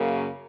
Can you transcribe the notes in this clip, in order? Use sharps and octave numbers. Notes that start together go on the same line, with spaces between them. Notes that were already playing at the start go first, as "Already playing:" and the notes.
Already playing: F#2 C#3 A#3